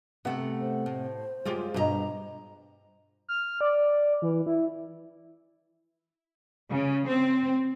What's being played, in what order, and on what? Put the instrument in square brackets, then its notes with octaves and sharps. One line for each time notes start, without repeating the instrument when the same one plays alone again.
[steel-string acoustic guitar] C3 F#5 [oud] A3 B3
[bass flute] C5
[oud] A2
[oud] F#2 F4 G4 [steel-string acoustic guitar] G#3
[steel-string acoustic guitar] G2 G#4 A#5 [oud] B2 D#5
[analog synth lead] F6
D5
E3
E4
[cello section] C#3
C4